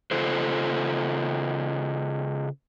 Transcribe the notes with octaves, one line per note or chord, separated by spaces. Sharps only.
C#3 F4 A4 C5